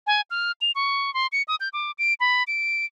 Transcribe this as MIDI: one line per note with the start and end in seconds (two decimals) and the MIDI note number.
0.07 0.21 80
0.31 0.52 89
0.61 0.72 101
0.75 1.13 85
1.14 1.27 84
1.32 1.42 97
1.48 1.56 87
1.60 1.69 91
1.73 1.91 86
1.99 2.14 98
2.20 2.43 83
2.47 2.85 98